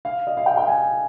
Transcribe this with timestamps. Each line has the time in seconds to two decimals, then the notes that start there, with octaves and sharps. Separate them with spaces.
0.05 F5
0.27 D#5
0.37 F5
0.46 G5
0.57 G5
0.67 G#5